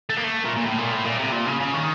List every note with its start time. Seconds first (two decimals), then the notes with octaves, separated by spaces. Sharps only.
0.10 A3
0.17 A#3
0.24 A3
0.44 A#2
0.56 A#2
0.65 A2
0.78 A#2
0.92 A2
1.05 A#2
1.19 C3
1.32 A#2
1.47 C#3
1.60 C#3
1.74 D#3